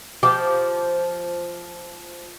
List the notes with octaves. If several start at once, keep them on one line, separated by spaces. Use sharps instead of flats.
F3 G4